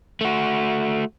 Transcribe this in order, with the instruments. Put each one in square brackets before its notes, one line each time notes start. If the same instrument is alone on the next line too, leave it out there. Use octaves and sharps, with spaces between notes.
[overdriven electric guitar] A3 F#4